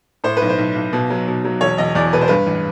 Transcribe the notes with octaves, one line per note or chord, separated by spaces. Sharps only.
A2 C5
B1 B4
C5
B1
B1
B2
F#3
B2
F#3
E1 C#5
E1 D#5
E2 D5
B2 B4
C5
G2 B4
A1